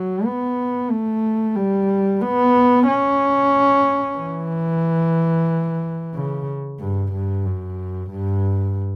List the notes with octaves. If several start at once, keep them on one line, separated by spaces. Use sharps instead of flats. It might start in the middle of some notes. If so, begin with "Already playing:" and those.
Already playing: F#3
B3
A3
G3
B3
C#4
E3
C#3
G2
G2
F#2
G2